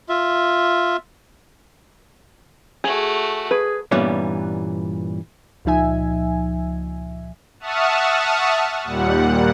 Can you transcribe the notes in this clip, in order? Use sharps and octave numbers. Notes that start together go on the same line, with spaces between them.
F4 E5
A3 F#4 G#4
G#4 B4
G2 A#2 E3 G3 B3 C#4
C#2 A#2 F3 D#4 E5 G#5
E5 F#5 A5 C#6 D#6 F6
D#2 A#2 G3 F#5